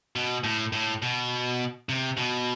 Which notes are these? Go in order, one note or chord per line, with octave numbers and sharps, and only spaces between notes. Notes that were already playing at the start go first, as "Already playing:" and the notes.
B2
A2
A2
B2
C3
B2